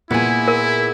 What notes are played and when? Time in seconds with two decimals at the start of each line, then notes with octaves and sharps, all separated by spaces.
0.10 A#2 B3 E4 G#4
0.48 A#4